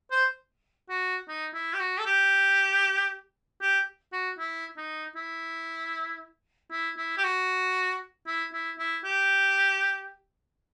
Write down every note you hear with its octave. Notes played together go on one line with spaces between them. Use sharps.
C5
F#4
D#4
E4
G4
F#4
A4
G4
G4
F#4
E4
D#4
E4
E4
E4
G4
F#4
E4
E4
E4
G4